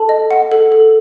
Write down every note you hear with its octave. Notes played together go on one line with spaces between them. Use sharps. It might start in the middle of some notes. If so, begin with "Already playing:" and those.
Already playing: A4 A5
D#5
F#5
A4
A4